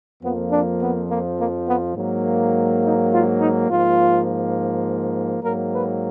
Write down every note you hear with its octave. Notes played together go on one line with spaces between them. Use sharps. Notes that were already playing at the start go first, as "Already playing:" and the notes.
F2 F3 A#3 B3
D4
B3
A#3
A#3
B3
G#2 F#3 A#3
D#4
F4
D#4
G#2 F3 A#3 F4
G#2 F#3 A#3 A#4
B4